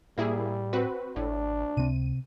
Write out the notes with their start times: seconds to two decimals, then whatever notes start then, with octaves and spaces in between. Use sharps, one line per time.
0.18 A2 G3 A#3 E4 G#4
0.73 C4 F#4 B4
1.16 G#1 A2 D4
1.77 C#2 C3 C4 D#7